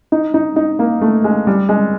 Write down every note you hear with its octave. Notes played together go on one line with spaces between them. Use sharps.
D#4
D#4
D#4
A#3
A3
G#3
G3
G#3